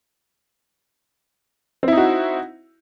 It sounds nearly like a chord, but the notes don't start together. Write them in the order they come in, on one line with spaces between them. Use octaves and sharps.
C4 E4 D#4 F#4